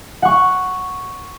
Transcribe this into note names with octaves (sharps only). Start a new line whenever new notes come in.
F#5 C#6